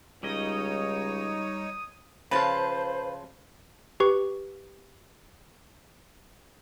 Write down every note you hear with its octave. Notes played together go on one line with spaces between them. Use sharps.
C#2 G3 D#4 C#5 D#5 D#6
C#3 F3 F4 B4 C5 A5
G4 B4 C#6